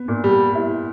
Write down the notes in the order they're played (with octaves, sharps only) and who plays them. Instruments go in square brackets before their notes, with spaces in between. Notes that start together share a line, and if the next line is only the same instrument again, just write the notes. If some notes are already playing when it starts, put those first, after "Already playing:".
Already playing: [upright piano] B3
A#2
[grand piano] G3
[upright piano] E4